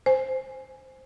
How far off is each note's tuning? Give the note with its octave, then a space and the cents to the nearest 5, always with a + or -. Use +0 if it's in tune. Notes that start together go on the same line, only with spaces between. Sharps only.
C5 +0 G#5 +0